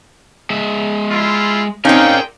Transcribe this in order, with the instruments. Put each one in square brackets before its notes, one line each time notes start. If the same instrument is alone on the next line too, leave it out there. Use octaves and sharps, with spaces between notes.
[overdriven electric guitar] G#3 E5
[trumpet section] E4 F4
[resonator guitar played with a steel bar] C4 C#4 [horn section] D#4 F5 [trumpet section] G#4 G5 [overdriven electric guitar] A#4 D5